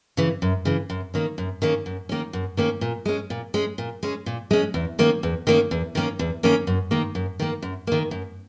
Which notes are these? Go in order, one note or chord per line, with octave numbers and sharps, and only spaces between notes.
C#3 E3
F#2
C#3 E3
F#2
D#3 A#3 C#4
F#2
D#3 A#3 C#4
F#2
D#3 A#3 C#4
F#2
D#3 A#3 C#4
A#2
G#3 C#4
A#2
G#3 C#4
A#2
G#3 C#4
A#2
G#3 C#4
E2
D#3 A#3 C#4
E2
D#3 A#3 C#4
E2
D#3 A#3 C#4
E2
D#3 A#3 C#4
F#2
D#3 A#3
F#2
D#3 A#3
F#2
D#3 A#3
F#2